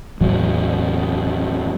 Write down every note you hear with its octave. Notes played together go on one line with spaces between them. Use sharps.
E2 A2 E3 F#3